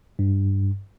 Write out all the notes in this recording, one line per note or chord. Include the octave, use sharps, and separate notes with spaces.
G2